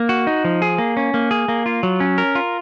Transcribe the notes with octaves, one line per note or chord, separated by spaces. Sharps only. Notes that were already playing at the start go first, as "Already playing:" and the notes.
Already playing: A#3
F#4
D#4
F3
G#4
A#3
C#4
A#3
G#4
A#3
F4
F#3
C#4
A#4
F4